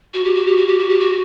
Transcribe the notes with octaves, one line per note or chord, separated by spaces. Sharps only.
F#4
G4
F#4
G4
F#4
G4
F#4
G4
F#4